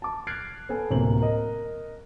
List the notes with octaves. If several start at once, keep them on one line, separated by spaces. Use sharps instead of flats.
A5 D6
F6 F#6 G#6 A6 C7 D7
B3 A4 G#5
D1 C3 A#3 F#7
A#4 D#5